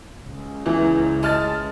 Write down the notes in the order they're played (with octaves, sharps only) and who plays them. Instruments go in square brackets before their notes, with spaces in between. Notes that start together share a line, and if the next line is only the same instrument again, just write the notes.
[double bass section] C#2
[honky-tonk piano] E2 [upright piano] E3
[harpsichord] G#3 [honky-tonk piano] A5 F6 A6